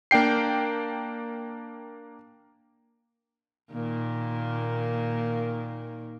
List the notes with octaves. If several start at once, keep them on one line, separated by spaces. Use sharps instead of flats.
A#3 D4 G5 C7
A#2 D#3 A#3